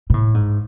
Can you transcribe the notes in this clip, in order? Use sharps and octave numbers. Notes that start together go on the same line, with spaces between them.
B2
A2
G#2